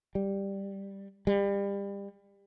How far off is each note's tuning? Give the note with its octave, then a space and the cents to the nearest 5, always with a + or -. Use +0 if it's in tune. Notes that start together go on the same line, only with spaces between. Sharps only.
G3 +5
G3 +30